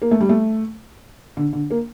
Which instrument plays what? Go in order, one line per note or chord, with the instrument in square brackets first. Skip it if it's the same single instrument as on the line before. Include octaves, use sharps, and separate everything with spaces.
[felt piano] A#3
A3
G3
A3
D3
D3
A#3